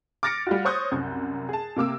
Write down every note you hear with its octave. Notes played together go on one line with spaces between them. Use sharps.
D6 F6 A6 A#6 C#7 D7
G3 F4 F#4
C5 C#5 C#6 D#6 F#6 G6
C2 F#2
G#4 A5
C3 A#3 D6 E6